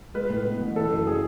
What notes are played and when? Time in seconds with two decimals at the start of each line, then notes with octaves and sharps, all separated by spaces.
0.14 G#3 B4
0.29 A2
0.45 B3
0.60 A1
0.75 E3 A4
0.90 F#2
1.07 G#4